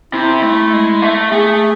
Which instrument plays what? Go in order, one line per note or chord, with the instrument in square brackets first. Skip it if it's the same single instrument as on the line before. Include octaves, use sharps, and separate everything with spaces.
[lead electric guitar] C3 [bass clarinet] E4
[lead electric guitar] A3
G#3
A3
[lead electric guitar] A3 [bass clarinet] G#4